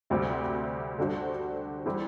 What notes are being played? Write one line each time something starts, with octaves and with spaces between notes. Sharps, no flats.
D2 C3 G3 C4 F#4
D3 G3 D4 F#4 C5
E3 G3 C4